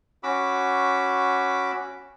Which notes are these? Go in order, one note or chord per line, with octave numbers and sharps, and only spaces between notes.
C#4 F#4 B5 D6 E6